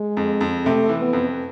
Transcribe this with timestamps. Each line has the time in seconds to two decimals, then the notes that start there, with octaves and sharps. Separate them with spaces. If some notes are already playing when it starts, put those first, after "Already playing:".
Already playing: G#3
0.17 F2
0.41 F2
0.66 C3 A3
0.89 E3
1.01 B3
1.13 F2